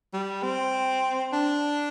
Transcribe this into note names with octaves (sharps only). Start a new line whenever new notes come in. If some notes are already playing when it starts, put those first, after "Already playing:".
G3
C4
D4